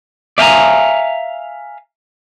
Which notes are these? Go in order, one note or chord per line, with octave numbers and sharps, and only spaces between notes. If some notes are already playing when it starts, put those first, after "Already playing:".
D5 E5 F5 G5 G#5 A#5